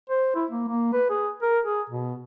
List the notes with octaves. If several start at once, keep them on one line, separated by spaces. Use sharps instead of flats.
C5
E4
A#3
A#3
B4
G#4
A#4
G#4
B2